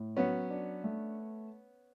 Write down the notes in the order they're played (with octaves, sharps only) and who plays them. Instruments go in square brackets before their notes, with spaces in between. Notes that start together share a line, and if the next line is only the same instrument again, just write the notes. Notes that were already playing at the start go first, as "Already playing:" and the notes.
Already playing: [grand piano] A2
[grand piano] F#3 [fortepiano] B3 C#4
[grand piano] D4
A3